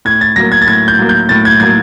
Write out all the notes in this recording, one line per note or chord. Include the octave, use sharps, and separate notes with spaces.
A2 G#6
A6
F#3 A#3 A#6
G#6
A6
A2 G#6
G6
F#3 A#3
G6
A2 A6
G#6
F#3 A#3 G#6